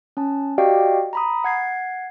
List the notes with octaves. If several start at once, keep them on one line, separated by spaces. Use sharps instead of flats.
C#4 A5
F#4 G4 D5 D#5 F5 G5
A#5 B5 D#6
F#5 G#6 C7